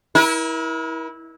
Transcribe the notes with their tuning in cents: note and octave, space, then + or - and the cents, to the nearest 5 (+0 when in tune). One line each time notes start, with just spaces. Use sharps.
E4 -20 A#4 +40